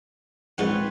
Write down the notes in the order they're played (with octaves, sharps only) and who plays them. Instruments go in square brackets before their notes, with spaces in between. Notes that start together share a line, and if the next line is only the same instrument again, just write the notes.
[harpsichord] A#1 G#2 F#5 [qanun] C4 B4 C#5